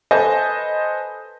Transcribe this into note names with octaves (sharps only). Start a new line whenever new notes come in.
A4 B4 C5 D#5 G#5 A5